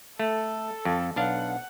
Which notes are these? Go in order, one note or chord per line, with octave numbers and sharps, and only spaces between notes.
A3 A4
F2
B1 D4 F5 F#5